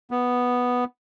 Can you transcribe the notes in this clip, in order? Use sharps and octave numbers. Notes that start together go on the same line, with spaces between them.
B3